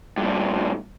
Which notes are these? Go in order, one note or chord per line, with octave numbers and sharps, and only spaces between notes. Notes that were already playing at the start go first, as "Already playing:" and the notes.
G2 A#2